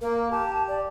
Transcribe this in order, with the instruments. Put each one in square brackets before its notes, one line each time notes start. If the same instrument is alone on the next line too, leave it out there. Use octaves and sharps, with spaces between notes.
[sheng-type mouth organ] A#3 [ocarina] A#4
[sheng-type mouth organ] G4 [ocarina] A5
[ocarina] D5